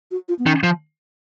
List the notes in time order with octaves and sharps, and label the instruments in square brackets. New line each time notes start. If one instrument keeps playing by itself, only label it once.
[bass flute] F#4
F4
B3
[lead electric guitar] D#3 [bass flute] C#4
[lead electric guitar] F3